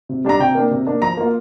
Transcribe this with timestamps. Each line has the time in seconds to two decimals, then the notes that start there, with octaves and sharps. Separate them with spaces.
0.09 C3
0.24 G3 D4 A#5
0.39 C3 G5
0.55 A#3 D4
0.71 C3
0.87 A#3 D4
1.02 F3 A#5
1.17 A#3 F4